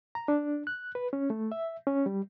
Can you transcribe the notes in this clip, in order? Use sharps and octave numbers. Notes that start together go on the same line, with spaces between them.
A#5
D4
F#6
B4
C#4
A3
E5
C#4
G3